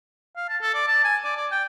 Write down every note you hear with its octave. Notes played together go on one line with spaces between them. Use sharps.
F5
A5
A4
D5
A5
G#5
D5
D5
G5